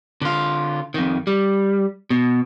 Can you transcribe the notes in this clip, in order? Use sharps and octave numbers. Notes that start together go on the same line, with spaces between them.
D3 F4
F2 D#3
G3
B2